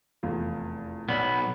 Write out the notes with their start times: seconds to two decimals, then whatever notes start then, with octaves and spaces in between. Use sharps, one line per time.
0.23 F1 E2 F4
1.09 B1 B3 C#5 D5 B5